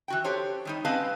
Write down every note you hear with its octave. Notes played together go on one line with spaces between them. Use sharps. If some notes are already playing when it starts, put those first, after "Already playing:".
E3 F#4 G5
G4 A4 C5 C#5
D#3 G3 D#4
C4 C#4 B4 D#5 F5 A5